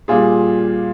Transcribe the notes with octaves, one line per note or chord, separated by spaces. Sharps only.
A#2 G3 F4 G#4